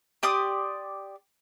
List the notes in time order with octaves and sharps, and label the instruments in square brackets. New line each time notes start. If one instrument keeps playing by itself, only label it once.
[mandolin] G4 D5 C6 D#6